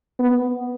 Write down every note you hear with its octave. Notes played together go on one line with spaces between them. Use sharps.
B3